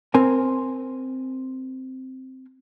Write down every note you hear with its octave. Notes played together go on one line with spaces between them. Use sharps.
C4 A#4 G#5